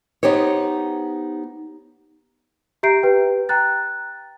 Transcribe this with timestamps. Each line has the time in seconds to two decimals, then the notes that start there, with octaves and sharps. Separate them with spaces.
0.23 B3 D#4 G4 C5 C#5
2.83 G4 E5 A#5 G6 C7 D7
3.03 G4 B4 G5
3.49 G5 A#5 F#6 A6